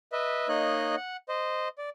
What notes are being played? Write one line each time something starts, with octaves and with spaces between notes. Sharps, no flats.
B4 D#5 E5
A#3 D#4 C#5 D#5 F#6
F#5
C5 D#5
D5